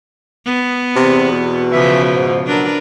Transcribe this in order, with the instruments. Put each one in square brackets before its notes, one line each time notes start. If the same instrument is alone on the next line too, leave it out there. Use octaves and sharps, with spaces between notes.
[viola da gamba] B3
[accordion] E2 [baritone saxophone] C3
[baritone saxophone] B2
[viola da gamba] C#3 F3 [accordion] E3 E5
[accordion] G#2
[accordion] F#3 [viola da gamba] D4 A#4 B4